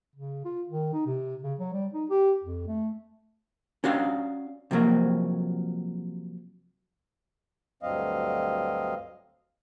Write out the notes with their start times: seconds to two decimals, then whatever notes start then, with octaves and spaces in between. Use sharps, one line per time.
0.16 C#3
0.45 F4
0.68 D#3
0.93 D#4
1.06 C3
1.43 C#3
1.59 F#3
1.73 G3
1.93 D#4
2.10 G4
2.44 F2
2.67 A3
3.84 C#4 D4 F#4 F5
4.71 C3 F3 F#3 A#3
7.83 D2 G2 F#3 C4 D#5 F5